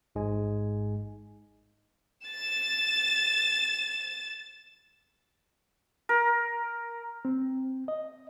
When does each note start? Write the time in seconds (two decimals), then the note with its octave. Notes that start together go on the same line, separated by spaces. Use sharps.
0.15 A1 G#2 G#3 G#5
2.27 A6 E7
6.09 A#4
7.25 C4
7.88 D#5